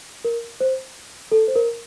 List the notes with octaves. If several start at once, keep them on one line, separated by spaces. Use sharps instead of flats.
A#4
C5
A4
C5
A#4